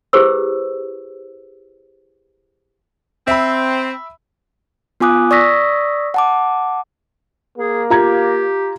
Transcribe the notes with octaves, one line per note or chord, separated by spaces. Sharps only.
E4 G4 G#4 B4 C5 E6
C4 E5 B5
B3 F4 G#5 D6 D#6 F#6
D5 C#6 D#6 E6 A#6 B6
F#5 A5 D6
A#3 G#4
F4 G4 A#5 G#6